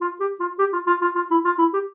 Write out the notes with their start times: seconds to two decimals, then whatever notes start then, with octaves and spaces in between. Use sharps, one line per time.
0.01 F4
0.20 G4
0.40 F4
0.59 G4
0.73 F4
0.87 F4
1.02 F4
1.15 F4
1.30 E4
1.45 F4
1.59 E4
1.73 G4